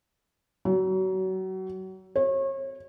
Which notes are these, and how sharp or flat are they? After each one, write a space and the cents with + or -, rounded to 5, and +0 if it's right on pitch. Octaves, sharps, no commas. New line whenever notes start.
F#3 +30
C#5 -35